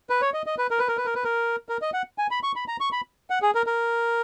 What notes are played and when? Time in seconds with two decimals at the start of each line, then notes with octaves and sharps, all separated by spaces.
0.10 B4
0.21 C#5
0.34 D#5
0.46 D#5
0.58 B4
0.71 A#4
0.79 B4
0.88 A#4
0.97 B4
1.05 A#4
1.15 B4
1.24 A#4
1.69 A#4
1.82 D#5
1.94 F#5
2.18 G#5
2.31 B5
2.43 C#6
2.56 B5
2.68 A#5
2.80 C#6
2.92 B5
3.30 F#5
3.42 G#4
3.55 A#4
3.66 A#4